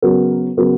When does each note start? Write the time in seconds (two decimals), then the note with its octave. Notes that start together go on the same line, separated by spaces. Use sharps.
0.02 C#3 F#3 B3 F#4 A#4
0.57 C#3 F#3 B3 F#4 A#4